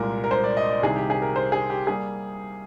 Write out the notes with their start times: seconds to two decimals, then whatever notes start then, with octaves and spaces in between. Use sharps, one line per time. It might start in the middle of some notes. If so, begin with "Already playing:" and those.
Already playing: C2 A#2 G#3 A#4
0.24 A#4
0.31 C5
0.44 D5
0.57 D#5
0.70 D5
0.83 C2 C3 D#3 G#4
0.96 G4
1.10 G#4
1.22 A#4
1.36 C5
1.52 G#4
1.70 G4
1.87 G3 A#3 G#4